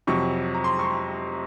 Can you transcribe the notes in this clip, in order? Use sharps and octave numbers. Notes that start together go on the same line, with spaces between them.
F2 C3 F#3 C#6
A#5
C6
C#6
C6